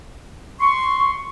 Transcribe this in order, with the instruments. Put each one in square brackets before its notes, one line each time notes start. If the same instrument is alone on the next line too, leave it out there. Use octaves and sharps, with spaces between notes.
[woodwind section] C6 C#6